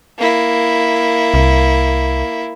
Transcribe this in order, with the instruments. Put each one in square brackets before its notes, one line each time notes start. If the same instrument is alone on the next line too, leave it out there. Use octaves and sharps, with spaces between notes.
[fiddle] A#3 E4
[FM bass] C2